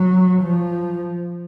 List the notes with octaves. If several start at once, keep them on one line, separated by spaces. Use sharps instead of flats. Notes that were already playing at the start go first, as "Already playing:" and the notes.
Already playing: F#3
F3